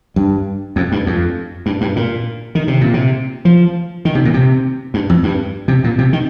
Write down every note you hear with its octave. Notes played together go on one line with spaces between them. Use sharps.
G2
F2
G2
F2
G2
G2
A#2
D#3
C3
A#2
C3
F3
D#3
C3
A#2
C3
G2
F2
G2
C3
A#2
C3
D#3